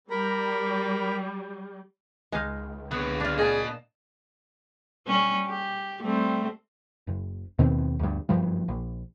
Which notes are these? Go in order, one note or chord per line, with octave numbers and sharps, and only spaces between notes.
G3 A#4 A#5 B5
C#2 G#3 D#4 F5
D3 B3 C#5
D4 F4
A#2 G#4 D#5 A5
G3 C#4
G4
G3 A3 C4
F#1
D#2 B2 D#3 C4
D2 G2
F#1 G2 F3 G3
A#1